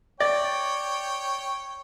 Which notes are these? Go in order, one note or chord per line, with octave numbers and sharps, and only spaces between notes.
C#5 D5 G5